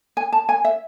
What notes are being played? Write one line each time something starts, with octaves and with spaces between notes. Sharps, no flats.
G#5
A5
G#5
E5